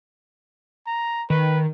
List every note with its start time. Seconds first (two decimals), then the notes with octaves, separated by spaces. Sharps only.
0.86 A#5
1.30 D#3 B4